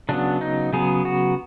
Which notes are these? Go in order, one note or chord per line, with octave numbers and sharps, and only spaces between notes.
C#3 F#3 B3 D4
D#4
C#3 F#3 B3 G#4
F#4